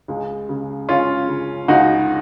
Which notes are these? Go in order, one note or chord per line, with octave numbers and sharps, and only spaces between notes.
C#2 G#3
C#3
C#2 C#4 F4
C#3
C#2 D#4 F#4